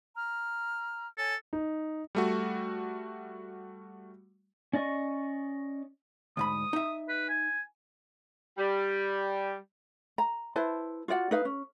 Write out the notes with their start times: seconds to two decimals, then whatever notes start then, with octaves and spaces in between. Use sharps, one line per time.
0.15 A#5 F6
1.18 A4 C#5 G#5
1.53 D#4
2.15 G3 A3 F#4
4.73 C#4 D5 D#5 C#6
6.37 D2 G#2 B5 D#6
6.73 D#4 E5
7.09 B4
7.29 G#5
8.58 G3
10.18 A#5
10.56 E4 B4 C5 A5
11.08 F4 F#4 D5 F#5
11.31 D#4 B4 F5
11.45 C#4